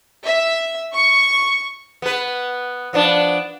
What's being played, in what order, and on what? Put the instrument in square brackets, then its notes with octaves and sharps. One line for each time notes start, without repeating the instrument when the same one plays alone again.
[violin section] E5
C#6
[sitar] B3 B4
F3 B3 D4